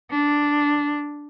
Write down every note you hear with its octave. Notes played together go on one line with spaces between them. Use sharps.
D4